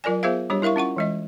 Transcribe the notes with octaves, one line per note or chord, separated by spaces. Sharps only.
F#3 F4 A#4 D5 G#5
B3 F4 G#4 C5 E5 F5
G3 D4 G4 C#5
E4 A#4 E5 F5 C#6
C#4 F4 F#5 C#6
E3 G#3 D#5